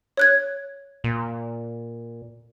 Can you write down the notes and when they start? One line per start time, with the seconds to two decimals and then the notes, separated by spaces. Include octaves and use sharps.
0.17 C#5 F#6 G#6
1.04 A#2